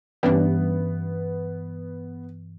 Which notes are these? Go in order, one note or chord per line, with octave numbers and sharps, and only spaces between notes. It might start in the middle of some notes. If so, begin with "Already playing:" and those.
G2 E3 G3 B3 C#4 D4